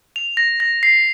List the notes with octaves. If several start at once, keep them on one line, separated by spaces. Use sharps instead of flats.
F7
A#6
A#6
C7